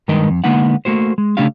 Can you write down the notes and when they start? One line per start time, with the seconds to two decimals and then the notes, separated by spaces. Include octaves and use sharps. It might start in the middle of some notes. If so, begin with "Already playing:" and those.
0.08 G2 D#3 G#3 A#4 B4 D#5
0.30 F2
0.44 D3 G#3 A#3 B3 D#4 F#5
0.85 A3 A#3 F#4 C5
1.18 G#3
1.37 C#3 A3 C#4 D4 G4 F5